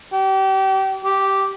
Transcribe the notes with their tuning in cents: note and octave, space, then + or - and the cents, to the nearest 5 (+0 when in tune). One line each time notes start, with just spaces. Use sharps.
G4 -30
G4 -5